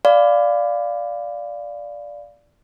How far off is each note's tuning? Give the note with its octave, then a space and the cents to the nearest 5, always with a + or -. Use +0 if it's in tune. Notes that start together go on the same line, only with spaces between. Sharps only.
D5 -5 F5 +0 B5 +30